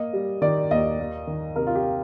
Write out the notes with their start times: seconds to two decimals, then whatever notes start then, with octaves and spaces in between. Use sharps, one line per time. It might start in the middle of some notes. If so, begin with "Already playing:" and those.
Already playing: A#3 D#5
0.13 G3
0.42 D#3 D5
0.71 D#2 D#5
0.99 A#3
1.27 D#3
1.56 C3 A#4
1.67 F4
1.75 G4